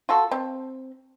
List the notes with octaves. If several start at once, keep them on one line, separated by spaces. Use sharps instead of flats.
F4 F#4 A4
C4